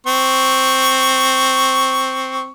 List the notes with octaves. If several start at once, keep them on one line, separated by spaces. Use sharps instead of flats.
C4 C#6